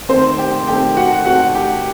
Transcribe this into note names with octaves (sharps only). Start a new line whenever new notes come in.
D#3 A3 C4 C5
G4 G5
D#3 A3 C4 G4 G5
F#4 F#5
D#3 A3 C4 F#4 F#5
G4 G5